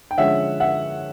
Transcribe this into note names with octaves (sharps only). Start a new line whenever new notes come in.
G5
D3 F3 G#3 C#4 E5 F#5
E5 F#5